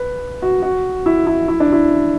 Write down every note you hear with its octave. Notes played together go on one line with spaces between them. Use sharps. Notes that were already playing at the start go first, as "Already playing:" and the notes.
Already playing: B4
F#4
F#4
E4
E4
E4
D4
E4